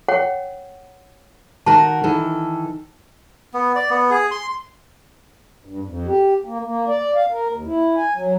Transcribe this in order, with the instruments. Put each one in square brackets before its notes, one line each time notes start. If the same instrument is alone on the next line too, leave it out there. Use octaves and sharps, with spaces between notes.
[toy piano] C#5 F#5 G5
[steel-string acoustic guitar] D#3 F#4 A#4 [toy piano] A5
[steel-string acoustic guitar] D#3 E3 A4
[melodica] B3
D5
B3
G#4
C6
[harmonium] G2
F2
G4
A#3
A#3
D5
F5
A#4
D#2
E4
G#5
F#3